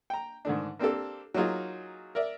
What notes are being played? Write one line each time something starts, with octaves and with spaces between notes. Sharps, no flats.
G5 A#5
G#2 D3 D#3 A3 D4
A#3 C4 D4 G4 A4
F#3 A#3 D#4 F4 G#4
A#4 D5 E5